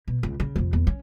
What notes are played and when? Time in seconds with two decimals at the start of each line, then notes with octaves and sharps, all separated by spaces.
0.08 B2
0.23 C#2
0.40 C#3
0.56 F2 C3
0.73 E2
0.87 C#4